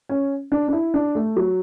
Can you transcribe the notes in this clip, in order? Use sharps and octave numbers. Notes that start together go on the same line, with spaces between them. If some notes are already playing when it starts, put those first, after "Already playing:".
C#4
D4
D4
E4
D4
A3
F#3